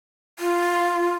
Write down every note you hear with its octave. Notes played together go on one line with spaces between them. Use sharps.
F4